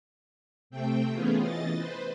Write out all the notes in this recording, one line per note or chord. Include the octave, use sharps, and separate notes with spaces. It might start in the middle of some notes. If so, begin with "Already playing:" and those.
C3 A3 C4 G5
E3 A3 B3 C#4 F4 G#4
E3 D#5 A6
B4 C5